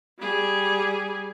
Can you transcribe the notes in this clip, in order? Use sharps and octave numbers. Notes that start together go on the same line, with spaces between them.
G3 G#4